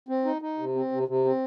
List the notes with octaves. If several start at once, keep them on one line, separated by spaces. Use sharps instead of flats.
C4
D#4
D#4
C3
C4
C3
C3
C4